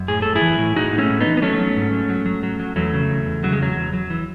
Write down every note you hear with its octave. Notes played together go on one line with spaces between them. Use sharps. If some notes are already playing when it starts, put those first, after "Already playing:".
Already playing: F#2
A2 G#4
A2 A4
E4 G#4
E3
A2
A2 D#4 F#4
A2
A3 C#4
A2
B3 D#4
E3
B3
F#3 A3 C#4
F#3
G#2
F#3
F#3
F#3
F#3
F#3
E2 F#3 A3
C#3
E2
E2
C#3 F#3
G#3
E2 F#3
E2
F#3
E3